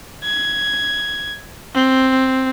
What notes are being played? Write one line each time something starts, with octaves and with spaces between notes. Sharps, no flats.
G#6
C4